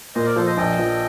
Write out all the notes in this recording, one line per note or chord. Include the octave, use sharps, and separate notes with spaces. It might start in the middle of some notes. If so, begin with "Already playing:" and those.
A#2 C5 D#5
A#4 D5
F3 A4 C5
C5 D#5
A#1 D#5 G5
F3